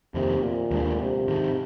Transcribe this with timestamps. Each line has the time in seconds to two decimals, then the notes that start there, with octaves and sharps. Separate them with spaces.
0.14 F2 C3 D#3 A#3
0.42 A#2
0.71 D#2 D#3 G#3 D4
1.00 C3
1.28 G#2 D#3 G#3